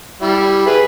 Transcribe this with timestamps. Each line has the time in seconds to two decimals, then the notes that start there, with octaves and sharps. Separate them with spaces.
0.22 G3 E4
0.66 G#4 B4 B5